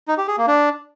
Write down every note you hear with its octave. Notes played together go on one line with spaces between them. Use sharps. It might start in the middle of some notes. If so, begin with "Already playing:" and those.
D#4
G4
G#4
A#3
D4